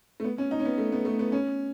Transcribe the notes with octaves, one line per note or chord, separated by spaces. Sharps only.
A3
B3
C#4
D#4
C#4
B3
A3
B3
A3
B3
C#4